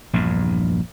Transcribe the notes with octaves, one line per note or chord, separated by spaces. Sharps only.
A#1 E2 G2